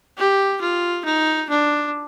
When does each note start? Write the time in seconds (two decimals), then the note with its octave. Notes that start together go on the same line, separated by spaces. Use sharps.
0.18 G4
0.61 F4
1.05 D#4
1.49 D4